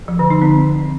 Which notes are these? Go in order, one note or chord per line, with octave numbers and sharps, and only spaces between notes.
F3
D3
D#4
C4